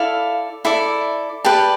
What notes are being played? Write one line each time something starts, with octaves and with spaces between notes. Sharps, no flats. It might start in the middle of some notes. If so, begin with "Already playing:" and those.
Already playing: E4 A4 D5 F5
E4 A4 D5
G4 B4 D5 A5